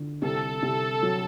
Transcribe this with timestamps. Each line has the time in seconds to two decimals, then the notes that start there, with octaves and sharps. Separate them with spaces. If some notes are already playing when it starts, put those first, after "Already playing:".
Already playing: D3
0.22 C2 A4
0.63 C2
1.03 F#3